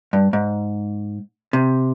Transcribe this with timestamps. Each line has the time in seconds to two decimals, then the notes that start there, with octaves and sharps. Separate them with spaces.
0.13 G2
0.33 G#2
1.53 C3